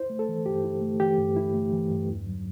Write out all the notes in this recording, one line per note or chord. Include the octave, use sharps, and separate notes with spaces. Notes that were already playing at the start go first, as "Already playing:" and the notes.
Already playing: E4 C5
A3
A4
E3
G2 G4
E4
A3
E3 G4
G2
E4
A3
E3
G2
E2
F#3